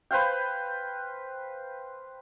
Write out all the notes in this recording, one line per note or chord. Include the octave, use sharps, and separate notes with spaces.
B4 C5 F5 G5